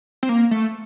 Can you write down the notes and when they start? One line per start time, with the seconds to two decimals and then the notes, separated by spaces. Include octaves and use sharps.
0.23 C4
0.29 A#3
0.51 A3